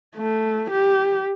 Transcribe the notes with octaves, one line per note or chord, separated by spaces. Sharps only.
A3
G4